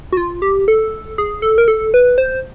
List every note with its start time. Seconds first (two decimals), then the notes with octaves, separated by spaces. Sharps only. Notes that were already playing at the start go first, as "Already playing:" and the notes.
0.12 F#4
0.17 F4
0.42 G4
0.68 A4
1.18 G#4
1.42 A4
1.58 A#4
1.68 A4
1.94 B4
2.18 C5